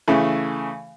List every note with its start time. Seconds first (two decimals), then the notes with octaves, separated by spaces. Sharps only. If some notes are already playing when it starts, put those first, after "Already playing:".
0.08 C#3 E3 A3